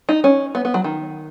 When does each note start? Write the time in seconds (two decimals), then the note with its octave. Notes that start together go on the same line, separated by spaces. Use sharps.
0.09 D#4
0.24 C#4
0.55 B3
0.65 B3
0.74 F#3
0.84 D#3